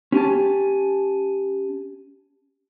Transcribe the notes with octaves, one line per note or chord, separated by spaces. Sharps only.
C#4 G4 G#5 A5